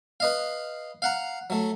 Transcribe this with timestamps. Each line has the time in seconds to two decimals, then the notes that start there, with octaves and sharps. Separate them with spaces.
0.20 B4 D#5 F5
1.02 F5 F#5 A#5
1.50 F#3 A3